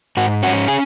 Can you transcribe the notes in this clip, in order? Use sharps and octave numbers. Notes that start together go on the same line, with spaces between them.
G#2 F#4
C#4 F#4
G#4